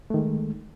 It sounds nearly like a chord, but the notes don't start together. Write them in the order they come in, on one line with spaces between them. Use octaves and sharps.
A3 D#3 G#3